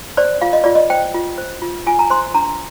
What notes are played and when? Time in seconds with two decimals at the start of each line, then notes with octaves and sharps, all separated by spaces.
0.17 C5 D5
0.42 F4 F5
0.53 D#5
0.64 F4 D5
0.75 D#5
0.90 C5 G5
1.14 F4
1.38 C5
1.62 F4
1.86 F4 G#5
1.99 A#5
2.10 C5 C6
2.35 D4 A#5